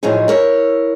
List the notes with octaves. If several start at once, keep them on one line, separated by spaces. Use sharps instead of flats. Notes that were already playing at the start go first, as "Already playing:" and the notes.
A2 D#3 F3 F#3 D#4 G#4
E4 A#4 C#5